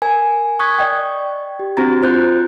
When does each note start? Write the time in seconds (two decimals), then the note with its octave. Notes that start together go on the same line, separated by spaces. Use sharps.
0.02 A#4 G#5
0.59 C#6 D#6 F#6 G#6 B6
0.78 D5 D#5 G5
1.59 G4
1.77 C4 D4 F#4 A#5 A6
2.02 F4 C5 F#6 G6